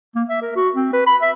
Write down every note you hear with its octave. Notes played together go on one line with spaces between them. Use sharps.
A#3
E5
A#4
F#4
C4
B4
B5
E5